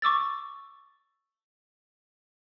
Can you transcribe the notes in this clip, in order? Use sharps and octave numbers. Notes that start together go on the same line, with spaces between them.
C#6 D6 E6 A6